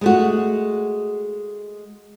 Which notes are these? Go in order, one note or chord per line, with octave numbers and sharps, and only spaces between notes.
G#3 A3 F#4